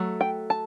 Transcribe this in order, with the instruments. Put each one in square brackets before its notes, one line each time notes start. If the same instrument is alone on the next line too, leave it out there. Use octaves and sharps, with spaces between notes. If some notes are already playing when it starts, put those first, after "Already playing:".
Already playing: [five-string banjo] F#3 A3
G5
A5